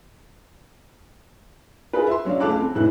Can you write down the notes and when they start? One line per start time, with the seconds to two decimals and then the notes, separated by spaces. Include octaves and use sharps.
1.93 F4 G#4 A#4 B4
2.07 E5 C6
2.25 F#3 C#4 D4 F5
2.40 C#2 A3 F5 A5 D6 F#6
2.60 C4
2.75 F1 C2 A2 F#6